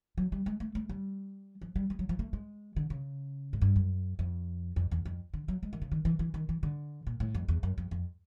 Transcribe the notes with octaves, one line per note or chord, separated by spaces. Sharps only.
F#3
G3
G#3
A3
A3
G3
F3
G3
G3
F#3
F3
A3
G#3
D3
C#3
G#2
G2
F#2
F2
F2
E2
F2
D3
F#3
G#3
D#3
C#3
D#3
E3
E3
D#3
E3
D3
A#2
A2
F2
E2
F#2
F2
F2